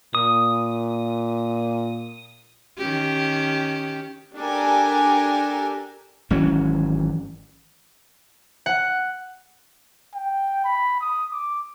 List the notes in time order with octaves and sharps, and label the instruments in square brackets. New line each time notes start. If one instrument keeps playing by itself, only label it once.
[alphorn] A#2 [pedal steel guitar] D#6
[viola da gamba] D#3 C#4 G4
[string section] D4 G4 A4 A#4 G#5
[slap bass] G#1 E3 F#3 C#4
[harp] F#5
[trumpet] G5
B5
D#6
D6